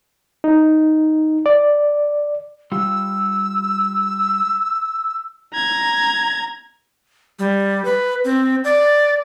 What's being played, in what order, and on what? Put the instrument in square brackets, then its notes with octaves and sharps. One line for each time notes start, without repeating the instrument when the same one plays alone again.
[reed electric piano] D#4
D5
[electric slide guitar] G3 F4 [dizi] E6
[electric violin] A#5 G#6
[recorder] G3
B4
C4
D5